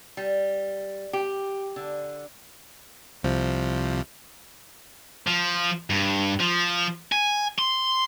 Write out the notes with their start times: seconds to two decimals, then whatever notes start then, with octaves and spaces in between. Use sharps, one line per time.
0.17 G3
1.13 G4
1.76 D3
3.23 C2 C3 F3
5.27 F3
5.90 G2
6.40 F3
7.12 G#5
7.58 C6